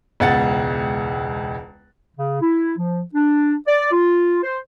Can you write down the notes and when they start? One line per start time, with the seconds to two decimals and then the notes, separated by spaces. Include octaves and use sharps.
0.20 E1 C#2 F#5 A6
2.17 C#3
2.41 E4
2.77 F3
3.14 D4
3.67 D5
3.91 F4
4.43 C5